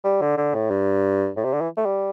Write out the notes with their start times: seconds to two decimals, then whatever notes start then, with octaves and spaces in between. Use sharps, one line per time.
0.04 G3
0.21 D3
0.37 D3
0.55 A2
0.70 G2
1.37 A2
1.44 C3
1.53 D3
1.61 E3
1.77 A3
1.85 G3